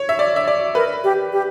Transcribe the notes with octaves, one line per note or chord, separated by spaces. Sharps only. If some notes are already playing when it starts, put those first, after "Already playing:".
Already playing: C#5
E5
D5
E5
D5
A#4 B4
G4
G4